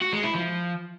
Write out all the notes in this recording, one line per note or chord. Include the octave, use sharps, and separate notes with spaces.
F#4
G#3
E4
F3